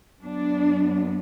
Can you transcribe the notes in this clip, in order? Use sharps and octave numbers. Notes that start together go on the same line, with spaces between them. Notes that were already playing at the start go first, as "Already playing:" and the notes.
F#2 F#3 B3 D4